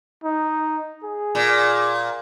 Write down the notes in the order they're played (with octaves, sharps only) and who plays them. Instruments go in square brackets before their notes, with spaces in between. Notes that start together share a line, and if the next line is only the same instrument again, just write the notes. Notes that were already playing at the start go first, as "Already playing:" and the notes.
[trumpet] D#4
G#4
[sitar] A#2